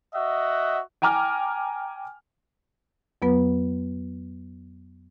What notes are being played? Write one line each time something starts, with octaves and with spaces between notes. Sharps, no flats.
F#4 D#5 E5 F#5
G5 G#5 A#5 D6 F6
F2 F#3 B3 B4